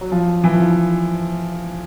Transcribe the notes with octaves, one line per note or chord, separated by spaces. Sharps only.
F#3
F3
E3
F3